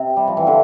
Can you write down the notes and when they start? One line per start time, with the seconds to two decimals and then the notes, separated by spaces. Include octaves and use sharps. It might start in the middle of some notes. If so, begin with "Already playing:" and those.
Already playing: C3
0.17 G3
0.27 F3
0.37 E3
0.47 D3